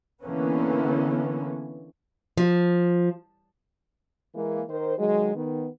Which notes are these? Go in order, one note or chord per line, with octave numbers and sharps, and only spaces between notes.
D3 E3 A#3 B3 C#4
F3
E3 G#3 A#3
D#3 A#4 C5
D#3 F#3 G#3
D#3 B3